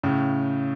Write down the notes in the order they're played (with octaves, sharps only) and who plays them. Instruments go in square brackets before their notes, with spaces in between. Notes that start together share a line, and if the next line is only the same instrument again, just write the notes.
[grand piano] A2 C#3